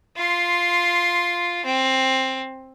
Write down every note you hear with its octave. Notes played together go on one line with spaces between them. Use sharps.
F4 C6
C4